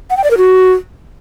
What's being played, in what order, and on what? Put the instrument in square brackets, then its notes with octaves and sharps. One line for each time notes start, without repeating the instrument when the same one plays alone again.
[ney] F#5
G5
D5
A#4
F#4